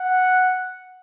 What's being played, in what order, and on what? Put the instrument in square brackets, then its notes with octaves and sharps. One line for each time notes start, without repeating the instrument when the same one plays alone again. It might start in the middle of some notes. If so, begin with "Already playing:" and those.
Already playing: [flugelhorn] F#5